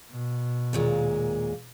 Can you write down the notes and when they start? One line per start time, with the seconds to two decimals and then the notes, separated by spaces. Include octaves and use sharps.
0.12 B2
0.73 D#2 A#2 G#3